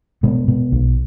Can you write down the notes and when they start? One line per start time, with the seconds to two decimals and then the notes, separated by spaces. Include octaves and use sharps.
0.23 B2 G#3
0.48 B2
0.72 B1